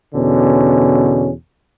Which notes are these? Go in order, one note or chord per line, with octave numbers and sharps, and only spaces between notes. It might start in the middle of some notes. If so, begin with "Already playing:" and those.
E2 B2 D3 C#4